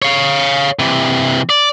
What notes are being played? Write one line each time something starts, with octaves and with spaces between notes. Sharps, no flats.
C#5 F5
C3 E3
D5